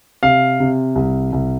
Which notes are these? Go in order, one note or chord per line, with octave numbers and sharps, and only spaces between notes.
C3 F5
C3
C2
C2